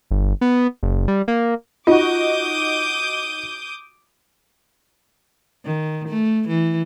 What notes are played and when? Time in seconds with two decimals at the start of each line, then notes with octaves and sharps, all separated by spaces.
0.11 G1
0.41 B3
0.83 F#1
1.08 G3
1.28 A#3
1.87 D#4 F4 F#4 D6 D#6 G6
5.65 D#3
6.08 A3
6.49 E3